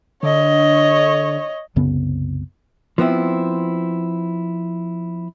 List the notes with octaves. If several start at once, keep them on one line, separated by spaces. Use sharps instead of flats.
D3 C#5 D#5
C2 F#2 C#3 B3
F3 B3 C4 E4